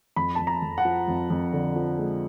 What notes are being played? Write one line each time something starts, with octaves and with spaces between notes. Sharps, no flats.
F2 B5
F2 A5
A#5
F2
F#5
F3
F2
F2
D3
F3
G#3